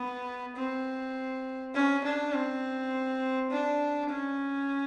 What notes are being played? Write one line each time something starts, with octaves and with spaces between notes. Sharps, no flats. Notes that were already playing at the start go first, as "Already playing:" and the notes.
Already playing: B3
C4
C#4
D4
C4
D4
C#4